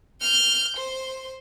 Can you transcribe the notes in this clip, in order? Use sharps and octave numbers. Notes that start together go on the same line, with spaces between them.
F6 G6
C5